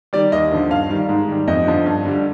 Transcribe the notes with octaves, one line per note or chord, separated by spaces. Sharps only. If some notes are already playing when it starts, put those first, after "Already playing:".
D#3 G3 D5
D#2 D#5
D3 F3
G2 F5
D#3 G3
G#2
D#3 G3
F2 D#5
D3 F3
G2
D3 G3